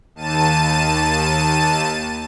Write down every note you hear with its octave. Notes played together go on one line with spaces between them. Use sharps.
D#2 A5 D#7